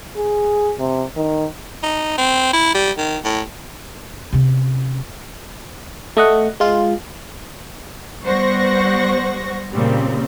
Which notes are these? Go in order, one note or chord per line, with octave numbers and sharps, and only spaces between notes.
G#4
C3
D#3
D#4
C4
E4
G3
D#3
A2
C3 C#4
A3 D#5 F#5
G#3 F4
G3 B3 C5 F#5 C#6 A#6
A#2 C#3 G3 C4